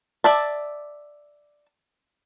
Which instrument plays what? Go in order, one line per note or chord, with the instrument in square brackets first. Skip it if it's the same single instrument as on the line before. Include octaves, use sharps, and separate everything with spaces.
[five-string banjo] D5 E5 A5